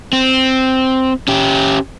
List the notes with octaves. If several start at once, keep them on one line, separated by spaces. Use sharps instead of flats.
C4
C#4 G4